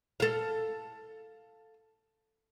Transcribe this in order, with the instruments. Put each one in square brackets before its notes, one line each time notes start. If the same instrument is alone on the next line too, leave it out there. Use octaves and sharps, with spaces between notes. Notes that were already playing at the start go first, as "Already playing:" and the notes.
[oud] A4 F5